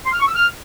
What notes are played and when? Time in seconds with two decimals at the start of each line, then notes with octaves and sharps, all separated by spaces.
0.05 C6
0.12 F6
0.20 C#6
0.27 E6
0.35 F6